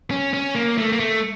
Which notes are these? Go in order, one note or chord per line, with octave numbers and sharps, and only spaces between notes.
C#4
C#4
A#3
A3
A#3
A3